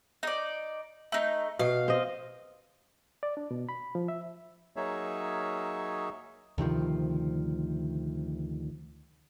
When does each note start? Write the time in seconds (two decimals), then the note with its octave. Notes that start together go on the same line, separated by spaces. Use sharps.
0.23 D#4 D5
1.12 A3 D#4
1.59 B2 F5
1.88 C4 D#5
3.23 D5
3.37 D4
3.51 B2
3.69 B5
3.95 F3
4.08 E5
4.76 F#3 A#3 D#4 G#4 C#5 E5
6.58 D2 C3 D#3 F3